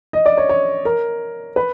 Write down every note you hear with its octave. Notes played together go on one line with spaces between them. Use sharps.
D#5
D5
C#5
C#5
A#4
B4